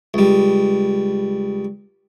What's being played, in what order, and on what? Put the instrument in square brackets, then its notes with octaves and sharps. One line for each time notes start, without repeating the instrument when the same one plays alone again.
[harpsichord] C#2 G3